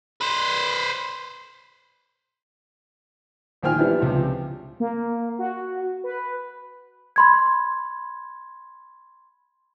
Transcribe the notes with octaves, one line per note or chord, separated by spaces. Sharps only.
B4 C5
A#1 D#3 C5 G5 G#5 F6
E3 G3 B3 D4 E4
C#2 C3 F3
A#3
F#4
B4
B5 C6 G#6